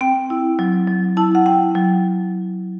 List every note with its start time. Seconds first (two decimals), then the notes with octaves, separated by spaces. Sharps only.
0.01 C4 G5
0.30 E4
0.59 F#3
0.87 F#3
1.17 E4 A5
1.35 F#5
1.46 E4 G5
1.75 F#3